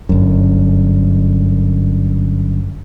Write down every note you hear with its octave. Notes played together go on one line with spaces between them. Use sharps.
G1 F#2